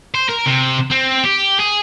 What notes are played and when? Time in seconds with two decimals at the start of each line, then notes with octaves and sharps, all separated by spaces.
0.14 C5
0.29 A#4
0.46 C3
0.92 C4
1.25 G4
1.60 G#4